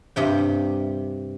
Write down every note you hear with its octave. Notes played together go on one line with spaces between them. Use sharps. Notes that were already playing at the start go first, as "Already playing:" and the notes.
G2 C3 G5